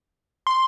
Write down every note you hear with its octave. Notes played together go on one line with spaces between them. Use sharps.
C6